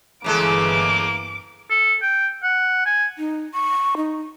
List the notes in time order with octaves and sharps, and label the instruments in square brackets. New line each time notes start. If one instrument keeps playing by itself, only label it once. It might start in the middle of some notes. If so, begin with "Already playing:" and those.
[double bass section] G1 E3 [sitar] C#3 G#3 A4 [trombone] A#3 [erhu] D6
[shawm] A4
G5
F#5
G#5
[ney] D#4
C#6
D#4